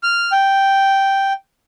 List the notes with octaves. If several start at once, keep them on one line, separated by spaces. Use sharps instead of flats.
F6
G5